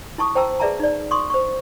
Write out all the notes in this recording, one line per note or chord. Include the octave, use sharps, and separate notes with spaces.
E4 A5 C#6 D#6
C5 G5 A5 A#5 E6
G#4 B4 D5 E5 A5 A#5
D#4 D5
C6 C#6 D#6
C5 C#6